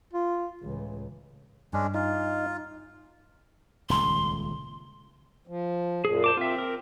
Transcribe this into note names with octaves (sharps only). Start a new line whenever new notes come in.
F4
C#2 A2 E3
G2 G#3 C#4 D4
D#4 F4
D#1 C#2 C6
F3
F#2 A#2 G#4
C5 A5 D6
C4 F4 E5
A#4